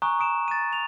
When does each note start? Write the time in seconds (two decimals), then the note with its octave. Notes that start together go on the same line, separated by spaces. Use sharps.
0.02 G#5 A#5 C#6 D#6 F#6
0.19 A#5 D#6 D7 E7
0.48 A6 D#7
0.73 F7